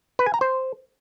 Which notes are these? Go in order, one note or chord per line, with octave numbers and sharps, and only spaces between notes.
B4
G#5
A#5
C5